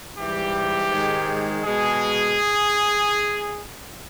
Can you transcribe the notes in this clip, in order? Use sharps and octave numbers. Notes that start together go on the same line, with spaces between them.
G#2 E3 G3 G4
G#2 D#3 G#3
B2 G#3 G#4